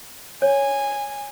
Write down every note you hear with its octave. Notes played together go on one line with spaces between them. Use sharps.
C#5 G#5